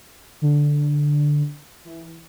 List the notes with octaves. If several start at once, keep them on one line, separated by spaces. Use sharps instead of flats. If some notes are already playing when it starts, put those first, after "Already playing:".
D3
E3